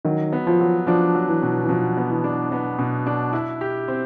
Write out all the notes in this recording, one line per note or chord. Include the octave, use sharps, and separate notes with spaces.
D#3 F#3
B3
F3
F#3
F3 D4
F#3
E3
B2
E3
B2 F3
B3
E3
D4
B3
B2
D4
E4
G4
C4